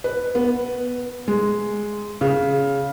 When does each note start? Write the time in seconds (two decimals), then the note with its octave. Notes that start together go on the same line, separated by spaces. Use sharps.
0.04 B4
0.35 B3
1.28 G#3
2.21 C#3